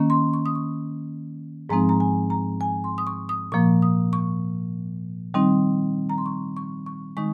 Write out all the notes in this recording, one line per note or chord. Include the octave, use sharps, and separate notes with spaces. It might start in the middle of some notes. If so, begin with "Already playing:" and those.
Already playing: D#3 A#3 C#4
C6
C#6
D#6
C#6
G#2 F3 G#3 C4 D#4 A#5
A#5
G#5
A#5
G#5
C6
D#6
C#6
D#6
A#2 F3 A#3 C#6
D#6
C#6
D#3 G3 C4 D#4
A#5
C6
C#6
C#6
C#6
D#3 G#3 D#4 C#6